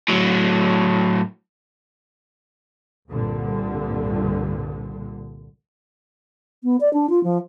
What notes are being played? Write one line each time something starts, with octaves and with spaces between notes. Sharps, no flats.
A2 F#3
C2 G2 A#2 D3
B3
D5
D4
F4
F3